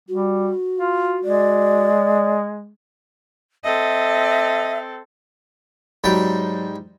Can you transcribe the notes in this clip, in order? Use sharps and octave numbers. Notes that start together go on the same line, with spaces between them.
G3 F#4
F4
G#3 D5
C4 A4 D#5 E5
G#2 F#3 G3 G5